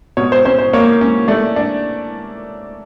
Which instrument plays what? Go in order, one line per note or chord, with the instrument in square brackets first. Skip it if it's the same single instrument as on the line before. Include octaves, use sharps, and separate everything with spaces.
[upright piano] B2 C#5
C5
C#4 C5
C5
A#3 C#5
C#4
A3 D5
D4